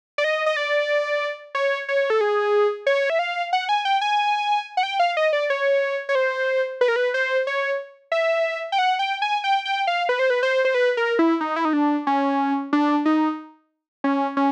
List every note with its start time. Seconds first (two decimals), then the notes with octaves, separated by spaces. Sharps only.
0.18 D5
0.24 D#5
0.46 D#5
0.57 D5
1.55 C#5
1.89 C#5
2.10 A4
2.21 G#4
2.87 C#5
3.10 E5
3.19 F5
3.53 F#5
3.69 G#5
3.85 G5
4.01 G#5
4.77 F#5
4.83 G5
5.00 F5
5.17 D#5
5.33 D5
5.50 C#5
6.09 C#5
6.15 C5
6.81 B4
6.88 A#4
6.96 B4
7.14 C5
7.47 C#5
8.12 E5
8.72 G5
8.78 F#5
8.99 G5
9.22 G#5
9.44 G5
9.65 G5
9.87 F5
10.09 B4
10.19 C5
10.30 B4
10.43 C5
10.65 C5
10.74 B4
10.97 A#4
11.19 E4
11.41 D#4
11.56 E4
11.65 D#4
11.73 D4
12.07 C#4
12.73 D4
13.05 D#4
14.04 C#4
14.37 C#4